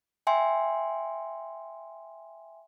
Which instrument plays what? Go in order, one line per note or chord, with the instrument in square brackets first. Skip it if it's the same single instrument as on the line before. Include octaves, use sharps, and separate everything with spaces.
[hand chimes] E5 G5 G#5 C6